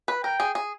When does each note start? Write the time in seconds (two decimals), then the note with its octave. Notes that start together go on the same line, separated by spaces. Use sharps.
0.08 B4
0.23 A#4 G5
0.40 G#4
0.55 G#4